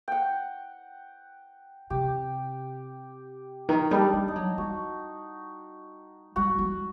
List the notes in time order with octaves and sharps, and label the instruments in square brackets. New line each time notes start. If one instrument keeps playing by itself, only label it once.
[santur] F#5 G5
[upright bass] C3 [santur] G4
[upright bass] D#3
[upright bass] G3 [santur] D#4
[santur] D4
[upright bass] G3
[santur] D#4
[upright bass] F#3
[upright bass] G3 [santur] F#4
[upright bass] G3 [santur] F#4
[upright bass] G3